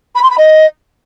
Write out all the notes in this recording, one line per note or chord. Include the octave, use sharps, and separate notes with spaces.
B5
C6
B5
D#5